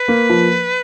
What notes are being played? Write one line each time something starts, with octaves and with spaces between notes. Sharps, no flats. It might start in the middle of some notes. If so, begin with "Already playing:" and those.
Already playing: B4
A#3
F3